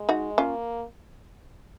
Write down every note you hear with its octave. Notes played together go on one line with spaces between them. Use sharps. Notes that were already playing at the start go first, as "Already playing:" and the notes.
Already playing: G#3
D#4 F#4
A#3 C#4 F4